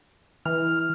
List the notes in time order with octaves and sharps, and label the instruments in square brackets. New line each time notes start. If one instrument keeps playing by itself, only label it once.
[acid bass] E3 [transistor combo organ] F6